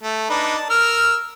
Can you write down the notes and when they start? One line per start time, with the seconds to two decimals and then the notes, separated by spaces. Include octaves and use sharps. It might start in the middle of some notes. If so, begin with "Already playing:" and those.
0.03 A3
0.30 D4 D#4 B4
0.57 A5
0.70 A#4 E6 F6